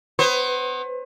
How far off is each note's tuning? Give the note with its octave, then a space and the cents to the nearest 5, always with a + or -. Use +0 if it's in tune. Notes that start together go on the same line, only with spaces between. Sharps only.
B3 +25 C5 +40